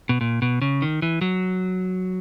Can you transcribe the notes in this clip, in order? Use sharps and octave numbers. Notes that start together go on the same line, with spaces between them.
B2
A#2
B2
C#3
D#3
E3
F#3